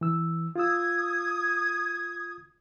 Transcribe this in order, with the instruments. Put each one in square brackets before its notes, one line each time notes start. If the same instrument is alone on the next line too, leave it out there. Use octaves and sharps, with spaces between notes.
[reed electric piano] E3 E6
[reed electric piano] F4 E6 [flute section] D#6 G#6